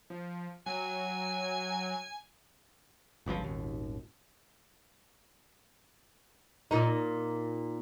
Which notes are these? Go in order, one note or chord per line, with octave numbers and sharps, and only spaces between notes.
F3
F#3 G#5
G1 C#2 D3 F3
D#1 G#1 D#2
A#2 D#4